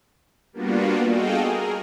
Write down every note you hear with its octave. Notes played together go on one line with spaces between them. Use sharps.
G3 A#3 B3 D4 F4 F#4
F#4 G#4 A4 D#5 F5 G5
G#4 A#4